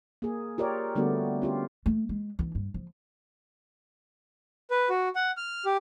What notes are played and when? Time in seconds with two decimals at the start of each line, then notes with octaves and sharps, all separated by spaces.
0.22 A#3 G#4
0.58 F4 G4 A#4 C#5 D5
0.96 D3 G3 A3 B3 F#4
1.42 C#4 F4 G4
1.86 A3
2.09 G#3
2.39 E3 D4
2.55 G2
2.74 F3
4.71 B4
4.90 F#4
5.15 F#5
5.37 F6
5.65 G4